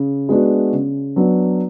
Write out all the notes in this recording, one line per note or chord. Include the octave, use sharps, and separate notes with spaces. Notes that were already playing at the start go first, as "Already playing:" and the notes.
Already playing: C#3
G#3 B3 D4 F#4
C#3
F#3 B3 D4